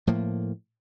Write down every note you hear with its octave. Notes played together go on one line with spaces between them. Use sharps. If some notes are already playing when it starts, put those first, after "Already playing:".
A2 F3 A#3